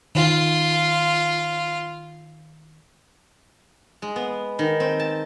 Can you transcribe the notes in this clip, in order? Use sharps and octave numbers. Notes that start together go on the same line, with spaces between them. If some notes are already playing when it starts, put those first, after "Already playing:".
D#3 F4
G#3
B3
D#3
C4
A5